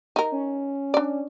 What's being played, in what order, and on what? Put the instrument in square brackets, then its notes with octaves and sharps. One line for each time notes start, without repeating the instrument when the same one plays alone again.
[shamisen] D#4 A#4
[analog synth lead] C#4
[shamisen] D4 D5